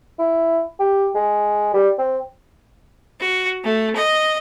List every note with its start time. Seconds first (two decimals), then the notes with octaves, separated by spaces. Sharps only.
0.19 E4
0.80 G4
1.15 G#3
1.74 G3
1.99 C4
3.21 F#4
3.64 A3
3.95 D#5